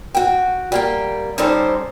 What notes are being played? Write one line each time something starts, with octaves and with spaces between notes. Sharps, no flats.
F#4 G5
G3 A#3 G5
G3 C#4 D#4 G4 A4 C5